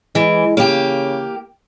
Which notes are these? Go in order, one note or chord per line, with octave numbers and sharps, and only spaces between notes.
E3 G#3
C#3 A#3 G4